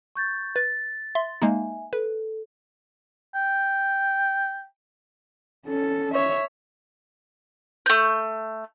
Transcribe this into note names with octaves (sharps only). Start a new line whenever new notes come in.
C#6 G6 A6
B4 A6
E5 C6
G#3 A#3 D#4 E5 G#5
A4 B4
G5
C#4 A4
C#5 E5
A3 G6